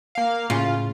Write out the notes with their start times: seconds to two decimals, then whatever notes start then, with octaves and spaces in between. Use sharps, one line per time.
0.15 A#3 F5
0.50 A2 C#3 F4